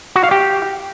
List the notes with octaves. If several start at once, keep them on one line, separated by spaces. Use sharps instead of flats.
F#4
F5
G4